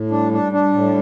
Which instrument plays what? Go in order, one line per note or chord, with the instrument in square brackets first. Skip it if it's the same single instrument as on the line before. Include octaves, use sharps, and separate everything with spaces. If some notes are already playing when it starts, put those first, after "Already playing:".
Already playing: [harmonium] A2
[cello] G3 [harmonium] D4
[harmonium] D4
D4
A2